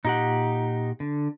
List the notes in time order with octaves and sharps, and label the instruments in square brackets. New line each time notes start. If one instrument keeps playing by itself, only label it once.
[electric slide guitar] A#2 G4 F#5 [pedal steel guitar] D#4
[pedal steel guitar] D3